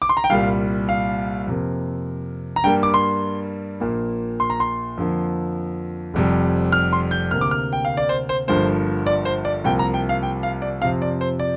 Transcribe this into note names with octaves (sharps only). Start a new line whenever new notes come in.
D6
C6
A#5
G5
C2 A#2 G3 F5
F5
F2 C3 A#3
A#5
G2 G3 A#3 G5
D6
C6
A#1 A#2 A#3
C6
A#5
C6
F2 D3 F3 A#3
F1 F2 C3 G3
F6
C6
G6
D2 C3 A#3 F6
D6
F6
G5
F5
D5
C5
C5
G1 G2 F3 A#3 C5
D5
C5
D5
C2 C3 F3 A#3 G5
A#5
G5
F5
G5
F5
D5
F2 C3 F3 C4 F5
D5
C5
D5